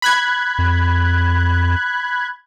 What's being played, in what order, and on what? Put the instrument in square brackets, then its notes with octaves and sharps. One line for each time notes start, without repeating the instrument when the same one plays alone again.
[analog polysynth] B5 F#6 G#6
[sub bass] F2